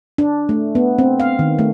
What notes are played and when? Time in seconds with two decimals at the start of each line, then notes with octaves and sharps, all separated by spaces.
0.18 D4
0.49 A3
0.75 B3
0.98 C4
1.20 F5
1.39 D#3
1.59 A3